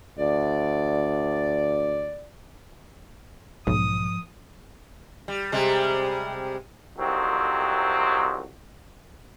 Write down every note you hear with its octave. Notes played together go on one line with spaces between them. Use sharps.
D2 D5
B1 G#2 F3 D#6
G3
C3 G3 G#3
C2 F2 C3 D#3 F#3 C4